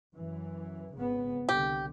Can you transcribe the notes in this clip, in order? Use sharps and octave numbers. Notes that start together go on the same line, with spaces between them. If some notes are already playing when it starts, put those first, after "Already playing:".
F#2 E3
G#1 C#3 B3
C2 D3 G4